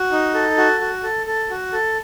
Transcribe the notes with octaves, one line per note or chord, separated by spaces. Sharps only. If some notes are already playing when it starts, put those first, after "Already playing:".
Already playing: F#4
D#4
A4
F#4
F#4
A4
A4
F#4
A4